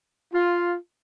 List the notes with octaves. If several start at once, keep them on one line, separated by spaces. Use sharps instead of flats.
F4